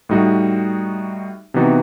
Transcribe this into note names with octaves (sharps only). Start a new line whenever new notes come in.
A2 G3 D#4 F#4
C3 E3 B3 D#4 F#4